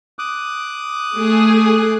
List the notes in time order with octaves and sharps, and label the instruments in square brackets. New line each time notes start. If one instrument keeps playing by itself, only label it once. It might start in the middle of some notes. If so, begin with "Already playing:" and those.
[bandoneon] D6 D#6 F#6
[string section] A3 G#4